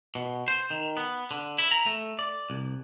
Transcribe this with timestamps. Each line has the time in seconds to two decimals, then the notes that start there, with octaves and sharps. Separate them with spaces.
0.15 B2
0.48 C5
0.70 D#3
0.97 B3
1.31 D3
1.58 E4
1.71 A#5
1.86 A3
2.19 D5
2.50 C2